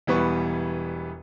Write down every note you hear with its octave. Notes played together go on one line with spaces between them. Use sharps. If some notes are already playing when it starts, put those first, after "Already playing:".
E1 E3 G3 B3 B4 C#6